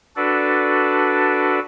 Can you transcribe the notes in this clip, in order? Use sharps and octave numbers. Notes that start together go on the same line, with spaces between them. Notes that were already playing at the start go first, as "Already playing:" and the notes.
D4 F#4 A4 B4 D5